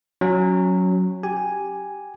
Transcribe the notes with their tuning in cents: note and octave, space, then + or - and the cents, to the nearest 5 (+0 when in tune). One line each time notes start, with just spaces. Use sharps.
F#3 -5 C#4 +0
G4 +0 G#5 +0